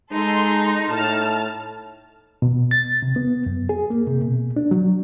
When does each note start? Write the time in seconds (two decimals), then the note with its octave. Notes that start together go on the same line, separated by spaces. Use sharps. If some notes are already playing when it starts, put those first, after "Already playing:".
0.12 G#3 D#4 A4 C6
0.89 A2 A5 F6
2.42 B2
2.71 A6
3.02 C3
3.16 B3
3.46 F#2
3.69 G#4
3.90 A#3
4.07 C3
4.22 B2
4.56 D4
4.71 F#3